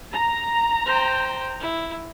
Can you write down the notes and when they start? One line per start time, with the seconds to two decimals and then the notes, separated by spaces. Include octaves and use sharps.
0.13 A#5
0.85 C5 G5
1.60 E4